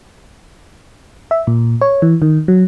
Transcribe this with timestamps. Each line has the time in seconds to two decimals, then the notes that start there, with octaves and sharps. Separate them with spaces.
1.31 E5
1.47 A#2
1.81 C#5
2.02 E3
2.22 D#3
2.48 F#3